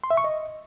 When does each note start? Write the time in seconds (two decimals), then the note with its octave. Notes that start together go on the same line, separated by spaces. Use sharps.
0.04 C6
0.10 E5
0.17 C#6
0.24 D#5